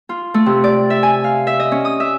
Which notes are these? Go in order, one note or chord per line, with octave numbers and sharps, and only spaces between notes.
F4
A3
C3
D5
E5
G#5
F5
E5
D#5
C#4
D#6
E5